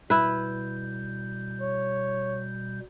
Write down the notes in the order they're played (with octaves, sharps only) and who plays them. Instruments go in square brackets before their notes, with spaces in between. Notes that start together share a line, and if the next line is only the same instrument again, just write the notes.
[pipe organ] B2 G3 G6 [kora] E4 B4
[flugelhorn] C#5